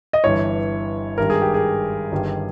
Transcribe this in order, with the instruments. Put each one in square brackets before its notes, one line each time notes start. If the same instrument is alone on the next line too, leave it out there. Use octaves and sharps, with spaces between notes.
[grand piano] D#5
G1 G2 E3 C#5
G#1 G2 G3 A#4
G#4
G4
G#4
G1 G2 D#3 G3